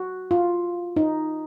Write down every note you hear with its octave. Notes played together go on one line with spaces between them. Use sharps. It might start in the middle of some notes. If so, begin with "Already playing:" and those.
Already playing: F#4
F4
D#4